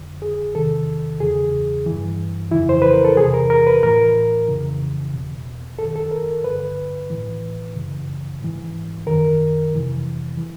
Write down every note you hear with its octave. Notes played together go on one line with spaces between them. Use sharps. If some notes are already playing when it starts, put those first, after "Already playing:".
Already playing: F2 D3
G#4
E2 C3 D#3 A4
E2 C#3 E3 G#4
E3
G2
F2 C#3 E3 E4
C5
B4
A#4
A4
E2 C3 E3 G#4
A#4
A#4
B4
A2 E3 A#4
F2 C#3 E3
E2 B2
F#2 D#3 A4
A4
A#4
G2 D3 B4
A2 E3
F#2 C#3 E3
G#2 E3
F#2 D#3 A#4
F2 C3 E3
E3